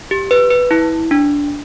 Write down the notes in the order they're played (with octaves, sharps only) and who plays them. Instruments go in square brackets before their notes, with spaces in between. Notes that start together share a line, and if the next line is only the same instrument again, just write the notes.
[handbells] G4
B4
B4
E4
D4